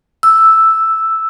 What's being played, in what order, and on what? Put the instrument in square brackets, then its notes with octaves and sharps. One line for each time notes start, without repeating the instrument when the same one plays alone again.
[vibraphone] E6